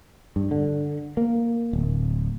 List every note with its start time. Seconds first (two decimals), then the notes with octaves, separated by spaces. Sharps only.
0.36 G2
0.51 D3
1.17 A#3
1.73 D1